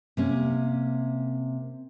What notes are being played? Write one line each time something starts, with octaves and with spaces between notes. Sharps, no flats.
C3 A#3 C#4